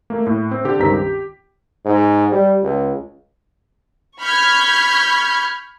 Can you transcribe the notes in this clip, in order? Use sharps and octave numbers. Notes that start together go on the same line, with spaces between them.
A3 A#3
A2
C4
D3 G4
C#2 G2 D#3 C4 A#5 B6
G4
G#2
G3
C#2
B5 C#6 F6 G6 G#6 B6